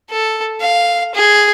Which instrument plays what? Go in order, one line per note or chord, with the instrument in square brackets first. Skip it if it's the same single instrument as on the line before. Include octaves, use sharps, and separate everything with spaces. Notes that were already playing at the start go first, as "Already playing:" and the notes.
[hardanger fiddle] A4
F5
G#4